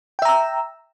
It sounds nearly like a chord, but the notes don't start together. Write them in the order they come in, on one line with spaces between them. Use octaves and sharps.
G5 E5 A#5 E6